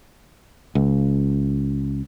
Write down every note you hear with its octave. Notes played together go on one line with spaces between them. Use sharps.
C#2